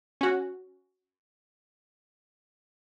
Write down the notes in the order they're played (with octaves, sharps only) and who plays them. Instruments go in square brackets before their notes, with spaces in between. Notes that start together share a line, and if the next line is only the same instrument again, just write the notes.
[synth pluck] C#4 F#4